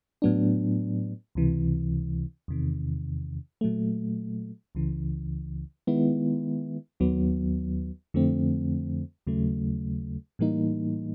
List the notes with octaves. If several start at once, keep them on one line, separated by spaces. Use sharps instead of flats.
A2 F#3 B3 D4
C#2 C3 E3
E2 C3 D#3
A#2 F#3 A3
C#2 C#3 E3
D#3 G#3 B3 E4
D#2 D#3 F#3 B3
F2 D3 F3 A3 C4
D#2 C#3 F#3 A3
A2 E3 G3 A#3 D#4